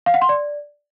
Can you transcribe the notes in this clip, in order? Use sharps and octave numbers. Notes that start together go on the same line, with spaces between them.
F5
F#5
C6
D5